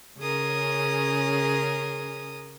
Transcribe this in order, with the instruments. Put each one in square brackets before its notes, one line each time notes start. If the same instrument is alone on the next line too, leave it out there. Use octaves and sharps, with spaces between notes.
[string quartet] C#3 C#4 G#4 A#4 D#6